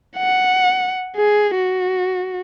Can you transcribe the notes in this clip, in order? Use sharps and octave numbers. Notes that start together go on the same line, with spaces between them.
F#5
G#4
F#4